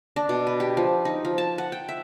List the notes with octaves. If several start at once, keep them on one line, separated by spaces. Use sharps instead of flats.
D4
B2
B4
G4
F3
D#4
F3
A5
F#5
G5
E5